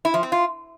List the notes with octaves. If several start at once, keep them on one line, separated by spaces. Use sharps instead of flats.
E4
F3
C4
F4